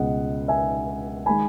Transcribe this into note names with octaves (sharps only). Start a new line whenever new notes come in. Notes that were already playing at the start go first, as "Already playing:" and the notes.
Already playing: C#2 B2 G#3 D#5 F#5
E5 G#5
D#3 G#3 G#5 B5